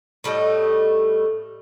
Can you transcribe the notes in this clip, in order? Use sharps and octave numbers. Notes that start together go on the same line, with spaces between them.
A2 G3 A3 D#5